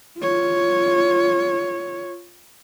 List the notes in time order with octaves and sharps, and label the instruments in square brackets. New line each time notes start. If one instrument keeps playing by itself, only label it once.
[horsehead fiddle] F4 C#5